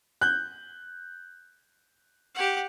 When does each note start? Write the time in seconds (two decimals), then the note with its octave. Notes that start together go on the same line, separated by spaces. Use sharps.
0.21 F#6 G6
2.35 G4 F#5